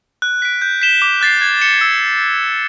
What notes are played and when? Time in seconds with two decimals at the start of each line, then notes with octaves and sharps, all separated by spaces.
0.22 F#6
0.42 B6 D7
0.62 G6
0.82 B6 E7 G7
1.02 D6
1.21 F#6 A6 C7
1.41 G#6
1.62 C#7 E7 G7
1.81 E6